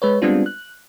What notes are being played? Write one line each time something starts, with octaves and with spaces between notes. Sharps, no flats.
G#3 B4 C#5
G3 G#3 B3 C4 D4 F4
F#6